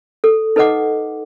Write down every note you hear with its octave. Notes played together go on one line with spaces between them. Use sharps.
A4
D#4 A4 B4 D#5 F#5 D6